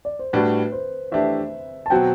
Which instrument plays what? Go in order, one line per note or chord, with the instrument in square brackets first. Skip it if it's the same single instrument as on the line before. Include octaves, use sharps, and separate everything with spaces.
[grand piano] D5
C5
[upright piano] A2 G3 D4 F#4 [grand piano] B4
[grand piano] C5
[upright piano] E3 A3 D4 G4 [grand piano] E5
[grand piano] A5
[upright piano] B2 F#3 C4 F#4 [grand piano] G5